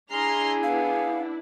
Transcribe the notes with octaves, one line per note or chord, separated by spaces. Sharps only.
D4 E4 G#4 A#5 C6 F6
B3 F5